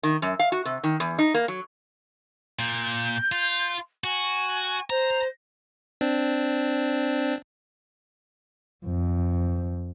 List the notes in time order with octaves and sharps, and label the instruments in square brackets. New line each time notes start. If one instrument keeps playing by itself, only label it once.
[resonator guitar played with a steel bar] D#3
F#2
F5
F#4
C3
D#3
E2
D#4
A#3
F#3
[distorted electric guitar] A#2 [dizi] G6
[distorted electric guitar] F4
[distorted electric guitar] F#4 [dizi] G#5
[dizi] C5 [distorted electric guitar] A#5
[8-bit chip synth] C4 D4
[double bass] F2